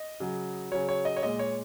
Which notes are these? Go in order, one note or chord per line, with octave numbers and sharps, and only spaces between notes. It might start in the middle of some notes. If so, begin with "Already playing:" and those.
Already playing: D#5
C#3 F#3
C#3 F#3 C#5
C#5
D#5
C#5
A#2 G#3 D#5
C#5